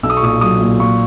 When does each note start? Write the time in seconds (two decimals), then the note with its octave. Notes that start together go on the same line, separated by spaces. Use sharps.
0.03 B1 E6
0.10 D#6
0.17 C#6
0.22 A#2 D#6
0.41 F#3 D#6
0.61 A#2
0.80 A#2 C#6